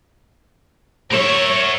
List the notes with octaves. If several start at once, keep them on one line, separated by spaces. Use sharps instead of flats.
A#4 C#5 E5